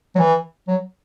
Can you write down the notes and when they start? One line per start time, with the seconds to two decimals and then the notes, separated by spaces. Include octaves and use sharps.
0.15 F#3
0.19 E3
0.68 F#3